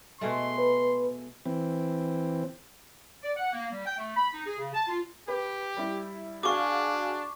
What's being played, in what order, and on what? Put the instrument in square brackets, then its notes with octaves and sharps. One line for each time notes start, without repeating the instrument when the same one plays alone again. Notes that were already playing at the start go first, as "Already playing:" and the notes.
[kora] B2 G#3 A3 [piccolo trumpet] C6
[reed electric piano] B4
[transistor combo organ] E3 C4
[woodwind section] D5
F#5
A#3
G3
G5
A3
B5
D#4
G#4
C#3
A5
F4
[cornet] G4 [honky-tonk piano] B4
[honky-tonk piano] G3 E4
[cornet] D4 [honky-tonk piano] F#4 G#4 F5 [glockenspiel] C#6 D6